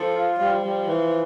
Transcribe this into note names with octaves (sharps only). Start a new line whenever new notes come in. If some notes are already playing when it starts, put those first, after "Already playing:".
Already playing: F3 A4
F4
F3 G3
G3
E3